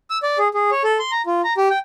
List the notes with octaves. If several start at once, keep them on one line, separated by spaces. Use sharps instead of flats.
E6
D5
G#4
G#4
C#5
A4
C6
A#5
F4
A#5
G4
G5